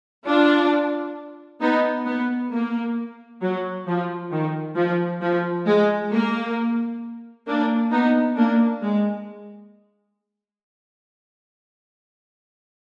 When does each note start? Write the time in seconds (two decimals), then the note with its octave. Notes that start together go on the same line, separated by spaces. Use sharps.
0.26 D4 F4
1.61 B3 D#4
2.06 B3
2.52 A#3
3.42 F#3
3.87 F3
4.32 D#3
4.77 F3
5.22 F3
5.67 G#3
6.12 A#3
7.47 A#3 D4
7.92 B3 D#4
8.37 A#3 D4
8.82 G#3